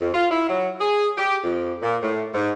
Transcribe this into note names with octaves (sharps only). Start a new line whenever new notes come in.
F2
F4
E4
F#3
G#4
G4
F2
A#2
A2
G#2